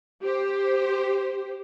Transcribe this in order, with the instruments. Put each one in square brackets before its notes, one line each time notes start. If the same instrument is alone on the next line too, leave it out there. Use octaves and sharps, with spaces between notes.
[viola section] G4 C5